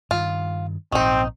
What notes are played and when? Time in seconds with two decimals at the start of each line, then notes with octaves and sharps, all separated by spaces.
0.11 G2 D#3 F4
0.92 A#1 G#2 D#3 C4 D#4